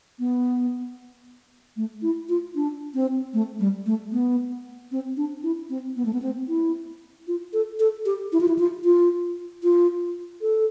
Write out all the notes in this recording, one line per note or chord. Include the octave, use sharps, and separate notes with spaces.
B3
A3
E4
F4
D4
C4
A3
G3
A3
B3
C4
D4
E4
C4
B3
A3
B3
C4
E4
F4
A4
A4
G4
E4
F4
E4
F4
F4
F4
A4